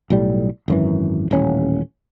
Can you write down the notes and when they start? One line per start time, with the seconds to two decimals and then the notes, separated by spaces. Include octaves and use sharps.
0.10 B1 A2 G3
0.68 G#1 F#2 E3
1.31 D#1 A1 C#4